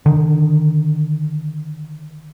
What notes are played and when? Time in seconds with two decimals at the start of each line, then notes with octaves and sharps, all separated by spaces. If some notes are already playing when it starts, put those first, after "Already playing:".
0.06 D3 D#3